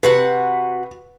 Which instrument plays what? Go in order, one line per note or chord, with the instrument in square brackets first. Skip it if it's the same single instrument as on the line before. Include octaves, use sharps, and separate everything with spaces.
[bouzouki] C3 F#4 F#5 [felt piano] B4